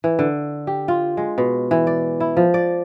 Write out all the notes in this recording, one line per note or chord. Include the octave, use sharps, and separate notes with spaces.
E3
D3
G4
F4
G#3
B2
E3
D5
E4
F3
D5